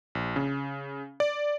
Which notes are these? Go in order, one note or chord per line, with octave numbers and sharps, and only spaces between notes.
A#1
C#3
D5